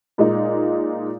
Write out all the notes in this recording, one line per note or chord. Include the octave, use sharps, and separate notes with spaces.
A#2 G#3 D#4